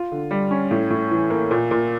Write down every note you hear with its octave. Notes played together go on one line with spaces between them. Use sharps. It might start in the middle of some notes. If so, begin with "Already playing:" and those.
Already playing: F4
D3
G3
C#4
A2
A2
E3
A#3
A#2
A#2